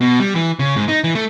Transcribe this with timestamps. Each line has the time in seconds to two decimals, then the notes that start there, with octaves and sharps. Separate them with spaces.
0.01 B2
0.20 G3
0.35 E3
0.59 C#3
0.76 G#2
0.88 D#4
1.04 E3
1.15 A3